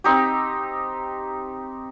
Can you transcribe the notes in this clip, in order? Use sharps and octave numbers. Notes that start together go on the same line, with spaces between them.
C4 D#4 G4